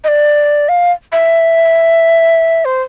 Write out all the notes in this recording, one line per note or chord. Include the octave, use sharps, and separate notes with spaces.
D#5
D5
F5
E5
C5